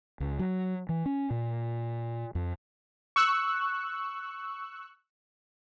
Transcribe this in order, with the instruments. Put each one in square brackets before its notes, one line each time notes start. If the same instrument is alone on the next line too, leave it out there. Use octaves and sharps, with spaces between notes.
[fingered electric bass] C#2
F#3
E3
C#4
A#2
F2
[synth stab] C#6 E6 F#6